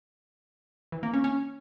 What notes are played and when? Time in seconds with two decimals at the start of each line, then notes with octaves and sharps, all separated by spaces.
0.92 E3
1.03 A#3
1.13 C#4
1.24 C#4